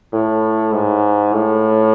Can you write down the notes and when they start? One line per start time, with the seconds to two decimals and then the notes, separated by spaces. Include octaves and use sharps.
0.13 A2
0.72 G#2
1.33 A2